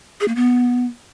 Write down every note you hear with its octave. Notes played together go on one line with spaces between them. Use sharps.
G#4
A#3
B3